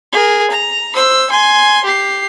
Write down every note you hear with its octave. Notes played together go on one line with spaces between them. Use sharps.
G#4 A#4
A#5
C5 E6
G#5 C6
G4 C7